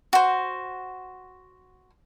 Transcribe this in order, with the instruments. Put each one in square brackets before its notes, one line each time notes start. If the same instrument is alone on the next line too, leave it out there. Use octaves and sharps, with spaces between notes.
[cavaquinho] F#4 C5